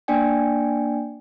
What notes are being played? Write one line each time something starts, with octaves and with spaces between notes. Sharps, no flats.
A#3 D4 D5 G5 G#5